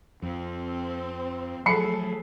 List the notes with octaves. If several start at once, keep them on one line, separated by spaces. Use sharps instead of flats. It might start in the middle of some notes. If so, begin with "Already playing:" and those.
F2 C4
F3 F#3 A3 G#4 A4 B5 C7 C#7